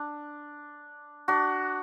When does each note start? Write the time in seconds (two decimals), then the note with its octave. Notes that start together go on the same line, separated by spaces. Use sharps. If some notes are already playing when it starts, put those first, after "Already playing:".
Already playing: D4
1.28 D4 F#4